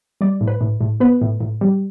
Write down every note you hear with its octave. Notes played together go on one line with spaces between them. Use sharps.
G3 D5
A2
B4
A2
A2
B3 B4
A2
A2
G3